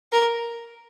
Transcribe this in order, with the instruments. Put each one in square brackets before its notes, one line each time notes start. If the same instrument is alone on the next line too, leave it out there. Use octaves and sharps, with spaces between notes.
[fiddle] A#4